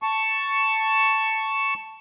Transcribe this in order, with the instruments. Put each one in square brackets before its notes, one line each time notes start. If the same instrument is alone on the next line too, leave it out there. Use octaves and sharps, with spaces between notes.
[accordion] A5 C#6